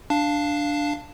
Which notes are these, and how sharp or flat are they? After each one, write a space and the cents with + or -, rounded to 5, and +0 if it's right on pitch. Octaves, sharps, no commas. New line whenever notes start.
D4 +0 F5 +0 A5 +0